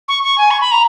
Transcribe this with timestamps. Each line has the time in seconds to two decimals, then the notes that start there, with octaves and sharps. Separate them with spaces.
0.08 C#6
0.23 C#6
0.38 G#5
0.51 C#6
0.61 B5
0.71 A#5